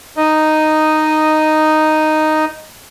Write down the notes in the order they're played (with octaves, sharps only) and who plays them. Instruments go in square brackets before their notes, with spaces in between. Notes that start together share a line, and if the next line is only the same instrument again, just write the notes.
[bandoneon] D#4 D#5